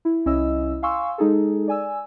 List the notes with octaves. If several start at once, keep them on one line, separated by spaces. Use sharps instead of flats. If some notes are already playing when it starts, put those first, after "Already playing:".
E4
C2 C#4 E4 D#5 E6
F5 G#5 C6 C#6 E6
G#3 D#4 G#4 A4
D5 G#5 E6